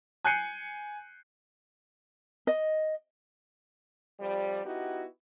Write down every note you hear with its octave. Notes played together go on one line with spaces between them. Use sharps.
G#5 F#6 G6 C7 C#7 D#7
D#5
F2 F3 G3
B3 D#4 E4 F#4 G4